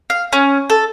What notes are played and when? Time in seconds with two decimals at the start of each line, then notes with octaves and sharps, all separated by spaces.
0.10 F5
0.33 C#4
0.70 A4